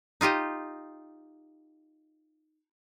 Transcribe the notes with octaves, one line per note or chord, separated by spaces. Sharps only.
D#4 F4 G4 D#5